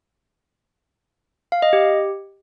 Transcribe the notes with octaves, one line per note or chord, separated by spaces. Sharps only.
F5
D#5
G4